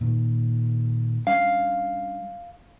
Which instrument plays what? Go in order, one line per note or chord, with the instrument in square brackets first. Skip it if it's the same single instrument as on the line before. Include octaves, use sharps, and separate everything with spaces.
[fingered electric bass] A#2 D#3
[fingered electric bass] G3 C#4 D4 [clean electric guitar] F5